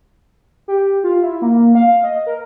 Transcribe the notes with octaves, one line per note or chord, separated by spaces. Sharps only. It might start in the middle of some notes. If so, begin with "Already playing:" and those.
G4
F4
E4
A#3
F5
D#5
A#4